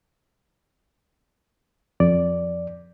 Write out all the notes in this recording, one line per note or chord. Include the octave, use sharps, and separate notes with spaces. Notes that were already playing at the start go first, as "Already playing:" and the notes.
F2 D5